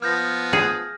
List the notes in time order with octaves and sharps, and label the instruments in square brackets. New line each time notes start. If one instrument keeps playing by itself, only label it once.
[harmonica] F3 B3 [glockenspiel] F6 G6 A#6
[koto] G#4